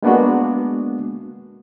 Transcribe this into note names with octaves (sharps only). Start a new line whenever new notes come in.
G#3 A#3 B3 D4 F#4